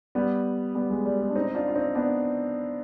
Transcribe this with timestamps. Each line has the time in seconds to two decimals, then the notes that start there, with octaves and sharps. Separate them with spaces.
0.15 G3 B3
0.75 G3 B3
0.90 G#3
1.05 G3
1.20 G#3
1.30 D4
1.36 C4 D#4
1.55 D4 F4
1.68 F4
1.75 C4 D#4
1.95 B3 D4